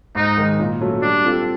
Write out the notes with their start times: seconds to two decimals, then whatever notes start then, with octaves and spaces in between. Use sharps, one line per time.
0.15 G#2 D#4
0.38 D#3 G#3
0.60 A#2
0.81 F#3 A3 C#4
1.02 G3 D4
1.24 C4 F4 A4